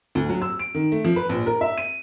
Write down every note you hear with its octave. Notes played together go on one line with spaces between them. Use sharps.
D2
F#3
E6
D7
D#3
A3
F3
B4
A#1
A#4
E5
D#7